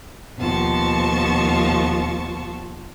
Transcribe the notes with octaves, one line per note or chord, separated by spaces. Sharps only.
D#2 B2 F3 F4 A5 C#6